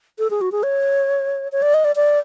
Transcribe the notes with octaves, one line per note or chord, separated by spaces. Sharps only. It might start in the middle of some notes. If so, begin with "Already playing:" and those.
A4
G#4
F#4
G#4
C#5
C#5
D5
D#5
D5
D5